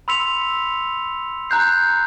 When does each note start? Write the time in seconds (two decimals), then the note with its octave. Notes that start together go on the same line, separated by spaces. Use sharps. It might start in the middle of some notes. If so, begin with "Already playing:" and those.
0.08 B5 C6 E6 B6 C#7 F7
1.50 A#5 F#6 G6 C7